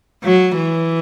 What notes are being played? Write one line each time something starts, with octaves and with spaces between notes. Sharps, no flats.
F#3
E3